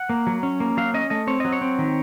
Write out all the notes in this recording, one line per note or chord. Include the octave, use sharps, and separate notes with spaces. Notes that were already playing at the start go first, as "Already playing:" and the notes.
Already playing: F#5
A#3
F#3
C#4
A#3
F#3 F5
C#4 D#5
A3 D#5
C4 C#5
F#3 D#5
C#5
C4
D#3